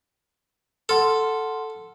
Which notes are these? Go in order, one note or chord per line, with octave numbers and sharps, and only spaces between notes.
A4 F#5 C6 F6